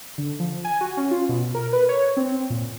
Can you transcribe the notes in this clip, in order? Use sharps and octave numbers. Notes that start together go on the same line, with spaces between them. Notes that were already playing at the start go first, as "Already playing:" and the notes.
D3
F3
G#5
F#4
C#4
F4
B2
A#4
B4
C#5
C4
A#2